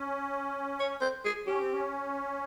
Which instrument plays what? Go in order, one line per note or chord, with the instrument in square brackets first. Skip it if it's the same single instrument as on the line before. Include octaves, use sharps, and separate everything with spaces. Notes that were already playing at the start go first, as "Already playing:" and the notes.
Already playing: [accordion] C#4
[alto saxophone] C#5
C5
G#4
[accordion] C#4 [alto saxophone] G4
[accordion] C4
C#4